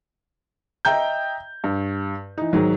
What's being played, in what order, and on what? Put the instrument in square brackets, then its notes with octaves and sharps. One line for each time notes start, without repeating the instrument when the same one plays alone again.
[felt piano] D#5 E5 G5 A#5 G6
G2
E3 D#4
G#2 D#3 F#3